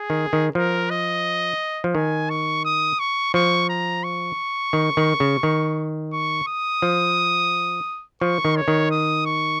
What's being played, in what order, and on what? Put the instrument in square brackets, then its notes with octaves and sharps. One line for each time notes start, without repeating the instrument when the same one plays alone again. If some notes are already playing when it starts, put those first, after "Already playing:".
Already playing: [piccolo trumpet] G#4
[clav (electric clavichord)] D#3
D#3
[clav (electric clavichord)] F3 [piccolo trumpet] A#4
[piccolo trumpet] D#5
[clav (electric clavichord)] F3
[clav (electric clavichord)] D#3 [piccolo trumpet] G#5
[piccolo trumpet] C#6
D#6
C#6
[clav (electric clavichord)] F3 [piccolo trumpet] C#6
[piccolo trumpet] A#5
C#6
[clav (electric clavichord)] D#3
D#3
C#3
D#3
[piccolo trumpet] C#6
D#6
[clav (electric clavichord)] F3
[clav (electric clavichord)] F3 [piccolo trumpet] C#6
[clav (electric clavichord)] D#3
[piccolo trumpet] C#5
[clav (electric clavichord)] D#3
[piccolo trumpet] D#6
C#6